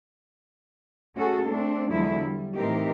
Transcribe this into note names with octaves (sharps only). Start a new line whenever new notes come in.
A3 C#4 F#4 G#4 A4
A3 C4 D4
E2 D3 F3 F#3 G#3 E4
G3
A2 E3 C4 D#4 G4 A#4